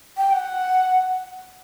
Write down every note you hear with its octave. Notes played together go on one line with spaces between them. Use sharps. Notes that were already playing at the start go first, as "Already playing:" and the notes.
G5
F#5